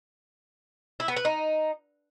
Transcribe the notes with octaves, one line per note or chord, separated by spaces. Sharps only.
E4
B3
B4
D#4